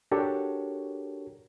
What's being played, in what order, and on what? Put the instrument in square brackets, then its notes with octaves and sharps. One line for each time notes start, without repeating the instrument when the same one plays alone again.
[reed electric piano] D4 F#4 G4 A4 A#4 C#5